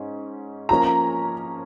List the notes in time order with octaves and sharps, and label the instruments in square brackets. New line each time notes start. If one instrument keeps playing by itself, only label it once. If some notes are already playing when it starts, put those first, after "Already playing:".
Already playing: [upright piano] G#2 C#4
[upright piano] F3 A#3 C#4 [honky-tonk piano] A#5